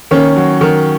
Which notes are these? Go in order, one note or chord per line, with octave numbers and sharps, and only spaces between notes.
D#3 A#3 C#4
F#3
D#3